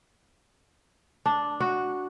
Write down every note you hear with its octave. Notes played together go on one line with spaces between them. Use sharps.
D4
F#4